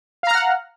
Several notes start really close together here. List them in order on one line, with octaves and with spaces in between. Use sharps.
F5 A#5 F6 F#5